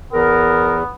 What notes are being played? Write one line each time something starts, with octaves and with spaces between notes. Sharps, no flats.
E2 B3 A#4